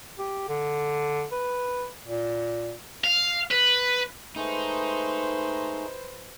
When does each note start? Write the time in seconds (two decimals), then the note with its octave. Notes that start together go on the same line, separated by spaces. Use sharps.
0.18 G4
0.49 D3
1.32 B4
2.04 A#2
3.04 F5
3.51 B4
4.36 G#3 A3 D#4 B4 C5